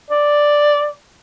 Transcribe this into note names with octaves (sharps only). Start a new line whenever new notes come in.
D5